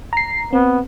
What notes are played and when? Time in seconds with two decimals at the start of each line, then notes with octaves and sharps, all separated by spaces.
0.13 A#5 C7
0.53 B3 C4